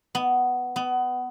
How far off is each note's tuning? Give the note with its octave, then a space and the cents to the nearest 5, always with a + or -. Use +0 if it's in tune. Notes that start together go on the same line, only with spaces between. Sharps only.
B3 +10
B3 +20